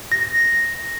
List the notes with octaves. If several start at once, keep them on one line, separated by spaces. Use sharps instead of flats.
A#6